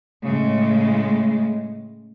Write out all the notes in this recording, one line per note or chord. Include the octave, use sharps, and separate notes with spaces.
A2 C#3 G#3